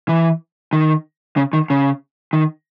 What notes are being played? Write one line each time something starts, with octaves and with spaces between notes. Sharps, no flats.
E3
D#3
C#3
D#3
C#3
D#3